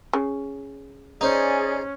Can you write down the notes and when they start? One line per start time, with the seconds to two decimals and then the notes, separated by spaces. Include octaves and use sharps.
0.13 C#3
1.21 C#4 D#4 G#4 C5 D5